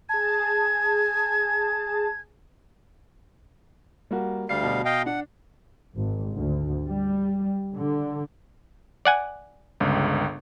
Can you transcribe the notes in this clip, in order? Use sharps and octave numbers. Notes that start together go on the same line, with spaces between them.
G#4 A5 G#6
G3 A#3 F#4
D2 G3 F5 C7
B2
D#5 F5 G5
D4 F#5
G#1
D2
G3
D3
D5 F#5 G#5
G1 C#2